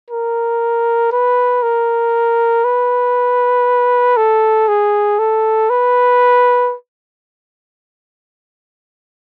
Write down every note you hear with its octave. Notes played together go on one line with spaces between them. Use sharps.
A#4
B4
A#4
B4
A4
G#4
A4
B4